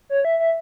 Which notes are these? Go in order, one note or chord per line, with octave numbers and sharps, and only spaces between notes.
C#5
E5
E5